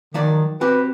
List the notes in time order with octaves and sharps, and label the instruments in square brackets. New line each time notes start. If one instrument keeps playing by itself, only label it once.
[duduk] D#3 [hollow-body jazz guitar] F3 F#3 D5
[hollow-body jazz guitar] C4 F#4 G4 [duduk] B4